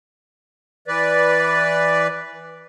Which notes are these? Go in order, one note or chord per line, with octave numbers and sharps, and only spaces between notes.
E3 B4 D5